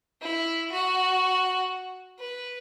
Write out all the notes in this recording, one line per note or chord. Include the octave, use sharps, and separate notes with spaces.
E4
F#4
B4